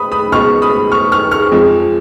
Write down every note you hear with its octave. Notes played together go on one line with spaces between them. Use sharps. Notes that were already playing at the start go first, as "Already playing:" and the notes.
Already playing: B5 D#6
B5 D#6
C#2 B2 G#3 C#6 F6
B5 D#6
C#6 F6
C#6 F6
C#6 F6
F2 F3 G#3